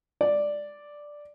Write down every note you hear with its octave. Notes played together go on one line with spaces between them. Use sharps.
D5